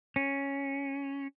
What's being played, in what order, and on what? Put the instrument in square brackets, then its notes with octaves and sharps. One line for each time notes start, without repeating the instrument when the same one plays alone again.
[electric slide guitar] C#4